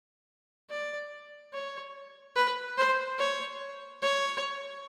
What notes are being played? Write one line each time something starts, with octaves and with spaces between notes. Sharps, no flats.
D5
C#5
B4
C5
C#5
C#5